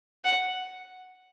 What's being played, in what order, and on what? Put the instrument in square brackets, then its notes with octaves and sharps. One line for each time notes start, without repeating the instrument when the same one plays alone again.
[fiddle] F#5